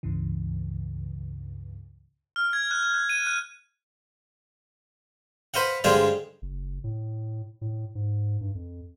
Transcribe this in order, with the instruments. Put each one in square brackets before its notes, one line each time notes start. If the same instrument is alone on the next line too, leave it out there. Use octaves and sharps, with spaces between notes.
[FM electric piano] C#2 G2 C#3 E3
[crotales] F6
G#6
F#6
F#6
F#6
D#7
F#6
[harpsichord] B4 C5 D#5 F5 F#5
G2 D3 G#3 G#4 C5 F5
[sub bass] F#1
A2
A2
G#2
G2
F2